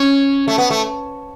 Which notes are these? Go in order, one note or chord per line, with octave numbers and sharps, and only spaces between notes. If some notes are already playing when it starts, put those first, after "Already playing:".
Already playing: C#4
A3
B3
A3